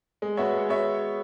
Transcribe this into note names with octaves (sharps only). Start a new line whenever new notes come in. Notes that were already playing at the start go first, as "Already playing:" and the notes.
G#3
B3 F#4 C#5 E5
G#3
B3 F#4 C#5 E5